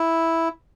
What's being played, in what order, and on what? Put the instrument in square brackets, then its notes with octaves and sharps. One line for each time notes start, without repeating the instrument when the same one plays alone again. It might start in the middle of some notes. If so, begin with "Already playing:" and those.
Already playing: [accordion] E4